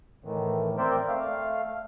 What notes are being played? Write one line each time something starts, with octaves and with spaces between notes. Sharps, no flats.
A2 D#3 E3
C4 A#4 C5 D5 E5 G5
A3 F5